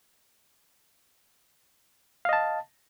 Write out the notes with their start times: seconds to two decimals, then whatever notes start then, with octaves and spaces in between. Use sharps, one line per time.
2.25 F5
2.29 D#5
2.33 A5